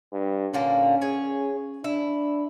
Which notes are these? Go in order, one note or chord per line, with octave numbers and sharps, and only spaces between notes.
G2
A#2 D3 A#3 C#4
G#4 C#5
D4 E4